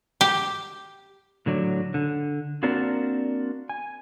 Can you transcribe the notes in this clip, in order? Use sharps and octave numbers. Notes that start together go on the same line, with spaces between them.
G4
A2 D3 F#3 D5
D3
A#3 C4 D4 F#4 A#4 D5
G#5